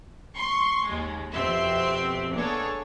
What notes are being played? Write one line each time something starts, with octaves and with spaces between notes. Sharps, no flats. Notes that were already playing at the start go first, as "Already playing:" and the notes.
C6 C#6
D#2 G#3
F2 B2 C4 G4 E5 C6
A#3 B3 D4 G#4 A4 C#5